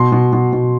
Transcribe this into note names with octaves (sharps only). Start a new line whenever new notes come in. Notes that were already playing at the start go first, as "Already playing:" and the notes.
Already playing: B2 C6
B2
B2
B2